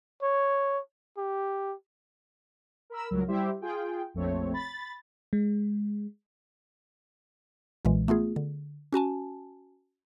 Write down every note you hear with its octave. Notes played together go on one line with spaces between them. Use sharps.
C#5
G4
A#4 B5 E6
C#2 G2 F#3 A#4
G3 E4 G4 C5 E5
F4 G#4 G5
A#1 F2 A3 C4 C#5
B5 A6
G#3
B1 A#2 E3 G#3
A3 B3 F4 G#4
D3
C#4 F#4 G#5 A5